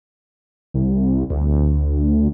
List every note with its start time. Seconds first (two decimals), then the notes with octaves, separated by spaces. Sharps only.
0.74 C2
1.30 D2